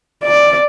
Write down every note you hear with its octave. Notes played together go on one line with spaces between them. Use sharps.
D5